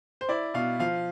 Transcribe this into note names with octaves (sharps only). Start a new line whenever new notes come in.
C5
E4 D5
B2 F5
F3 F5